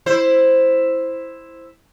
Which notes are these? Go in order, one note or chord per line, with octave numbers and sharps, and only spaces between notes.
E4 C5